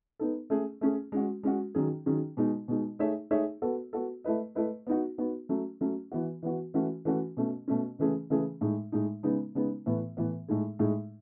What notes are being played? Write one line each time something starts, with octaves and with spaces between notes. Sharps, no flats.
B3 D#4 A4
A3 C#4 G#4
A3 C#4 G#4
G#3 C#4 F#4
G#3 C#4 F#4
D#3 F#3 C#4 G#4
D#3 F#3 C#4 G#4
B2 G#3 D#4
B2 G#3 D#4
A3 D#4 G#4 C#5 E5
A3 D#4 G#4 C#5 E5
B3 F#4 A4
B3 F#4 A4
A3 E4 B4 D#5
A3 E4 B4 D#5
B3 D#4 F#4
B3 D#4 F#4
F#3 A3 C#4
F#3 A3 C#4
E3 B3 F#4
E3 B3 F#4
E3 A3 C#4 F#4
E3 A3 C#4 F#4
B2 A3 C#4
B2 A3 C#4
C#3 E3 A3 C#4 G#4
C#3 E3 A3 C#4 G#4
A2 G#3 D#4
A2 G#3 D#4
C#3 G#3 B3 D#4
C#3 G#3 B3 D#4
A2 E3 B3
A2 E3 B3
A2 G#3 D#4 G#4
A2 G#3 D#4 G#4